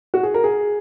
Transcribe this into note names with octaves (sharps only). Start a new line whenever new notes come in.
F#4
G#4
A#4
G#4